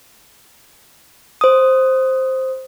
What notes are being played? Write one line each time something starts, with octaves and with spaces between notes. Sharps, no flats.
C5 D#6